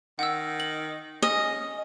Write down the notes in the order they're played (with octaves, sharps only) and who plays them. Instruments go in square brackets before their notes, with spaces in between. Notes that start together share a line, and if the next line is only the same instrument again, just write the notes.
[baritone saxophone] D#3 [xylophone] F#5 E6
[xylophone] F#7
[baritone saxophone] C#4 [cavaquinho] D#5 [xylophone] D#6